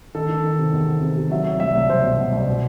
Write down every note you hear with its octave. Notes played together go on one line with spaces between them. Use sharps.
D#3 A4
D#3
D#3
C3
E2
C3
C3
C3
F#3 E5
F#3
C2 E5
C2
C2 C5
B2
B2
C2
B2